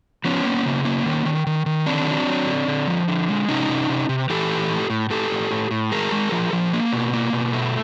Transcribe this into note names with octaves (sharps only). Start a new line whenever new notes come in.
F3 B3 C#4
A#3
C#3
A#3
D#3
D#3
D#3
D#3
D3 C4 D4
F#3
F#3
D3
D3
F3
D3
G#3
C3 C#4 D#4
C3
C3
C3
E3 G4 A4
A2
A2
A2
A2 G4 A4
A2
A2
A2
G#3 G#4 A#4
G#3
F3
F3
A#3
B2
A#3
B2
A3